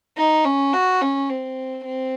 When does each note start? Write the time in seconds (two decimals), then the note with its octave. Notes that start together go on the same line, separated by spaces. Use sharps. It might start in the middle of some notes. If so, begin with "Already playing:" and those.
0.17 D#4
0.45 C#4
0.73 F#4
1.01 C#4
1.30 C4
1.85 C4